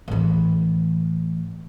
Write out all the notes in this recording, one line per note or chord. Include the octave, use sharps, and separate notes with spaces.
A2 E3